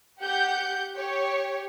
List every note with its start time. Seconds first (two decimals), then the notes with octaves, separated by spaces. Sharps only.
0.21 G4 F#5 G6
0.95 G4 C#5